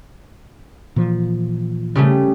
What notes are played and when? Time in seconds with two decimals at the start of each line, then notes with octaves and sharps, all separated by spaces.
0.96 A#2 E3 F3
1.95 C#3 G3 A3